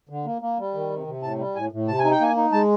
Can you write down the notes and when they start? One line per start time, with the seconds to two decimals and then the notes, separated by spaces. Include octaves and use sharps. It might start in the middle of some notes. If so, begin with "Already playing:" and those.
0.09 D3
0.25 A#3
0.42 A#3
0.58 G3
0.74 D#3
0.90 C3
1.07 C3
1.23 A2 A5
1.39 G3
1.55 A2 G#5
1.72 A2
1.88 C3 A5
1.99 G#5
2.04 D#4
2.11 G5
2.20 A#3 G#5
2.36 D#4
2.52 G#3 A5